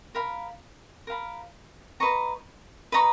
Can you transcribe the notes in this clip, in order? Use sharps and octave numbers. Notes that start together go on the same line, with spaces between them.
A#4 F5 B5
A#4 F5 B5
B4 D#5 A#5 C#6
B4 D#5 A#5 C#6